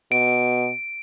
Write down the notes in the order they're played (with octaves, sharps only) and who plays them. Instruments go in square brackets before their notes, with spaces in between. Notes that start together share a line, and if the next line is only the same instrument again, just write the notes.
[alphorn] B2 [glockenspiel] D7